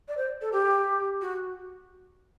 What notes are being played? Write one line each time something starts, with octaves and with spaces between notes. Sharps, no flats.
D5
C5
A4
G4
F#4